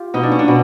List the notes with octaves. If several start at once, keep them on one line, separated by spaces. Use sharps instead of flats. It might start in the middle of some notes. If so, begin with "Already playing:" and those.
Already playing: F4 G4
B2 D#4
D4
C#4
D4
B2